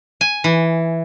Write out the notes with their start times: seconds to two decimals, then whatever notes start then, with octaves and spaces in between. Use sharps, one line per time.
0.21 G#5
0.44 E3